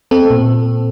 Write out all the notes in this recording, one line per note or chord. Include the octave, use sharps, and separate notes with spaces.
C4 A4
A#2